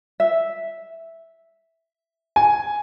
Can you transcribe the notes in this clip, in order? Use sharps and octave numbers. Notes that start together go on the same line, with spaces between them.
E5
G#5